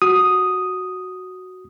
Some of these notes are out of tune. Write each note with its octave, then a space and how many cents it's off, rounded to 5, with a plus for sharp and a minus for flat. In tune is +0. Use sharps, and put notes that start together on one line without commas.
F#4 +0 D#6 +0